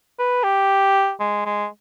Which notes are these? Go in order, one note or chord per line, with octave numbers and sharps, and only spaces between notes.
B4
G4
G#3
G#3